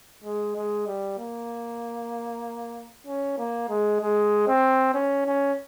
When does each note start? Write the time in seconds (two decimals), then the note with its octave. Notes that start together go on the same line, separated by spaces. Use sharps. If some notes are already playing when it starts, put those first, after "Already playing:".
0.24 G#3
0.56 G#3
0.87 G3
1.18 A#3
3.07 C#4
3.38 A#3
3.69 G#3
4.01 G#3
4.48 C4
4.94 C#4
5.25 C#4